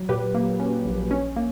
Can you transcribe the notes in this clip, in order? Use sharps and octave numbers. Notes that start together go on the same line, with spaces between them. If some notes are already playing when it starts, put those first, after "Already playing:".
Already playing: F#3
A#2 G4 B4
A#3
C#4
A#1
C#4
A#3